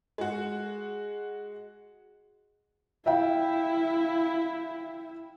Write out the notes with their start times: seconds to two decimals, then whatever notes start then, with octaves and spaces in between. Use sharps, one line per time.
0.18 G#3 F#4
3.06 E4 E5 F5 G5